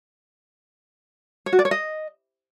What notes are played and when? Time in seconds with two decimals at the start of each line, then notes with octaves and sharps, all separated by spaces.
1.46 C#5
1.53 F#4
1.59 D5
1.65 C#5
1.71 D#5